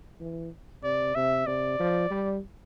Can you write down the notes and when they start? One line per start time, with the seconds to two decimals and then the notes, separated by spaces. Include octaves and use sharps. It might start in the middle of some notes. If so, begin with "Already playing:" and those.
0.21 E3
0.83 C3 D5
1.15 C3 E5
1.47 C3 D5
1.79 F3
2.10 G3